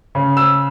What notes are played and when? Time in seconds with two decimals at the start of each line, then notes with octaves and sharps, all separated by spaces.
0.15 C#3
0.37 E6